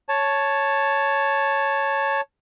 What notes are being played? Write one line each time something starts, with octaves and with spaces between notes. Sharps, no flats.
C#5 A5